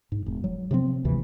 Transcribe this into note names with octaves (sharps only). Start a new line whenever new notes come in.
G#2
E1
F#3
C3 F3 A#3 C4
G#1 D2 C3 E3